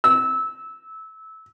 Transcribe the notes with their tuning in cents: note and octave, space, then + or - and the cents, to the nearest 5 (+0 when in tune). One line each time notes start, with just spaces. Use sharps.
E6 -20